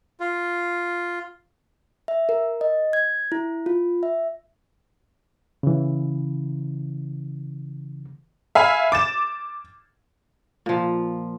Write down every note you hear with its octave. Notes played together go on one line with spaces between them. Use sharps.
F4
E5
A#4
D#5
G#6
E4
F4
E5
C#3 E3
E5 F5 G#5 B5
D6 A6 E7
A#2 F3